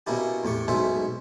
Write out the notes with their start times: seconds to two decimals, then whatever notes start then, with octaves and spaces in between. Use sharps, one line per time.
0.07 B2 A#3 C#4 E4 G4
0.44 E2 A2 G4 C#6
0.68 B1 G#2 B2 C#4 C5 E5